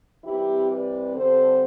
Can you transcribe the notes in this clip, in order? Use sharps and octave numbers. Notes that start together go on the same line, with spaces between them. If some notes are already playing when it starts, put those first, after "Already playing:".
C3 E3 G3 C4 E4 G4
B4 D5
G2 D3 G3 C4 A4 C5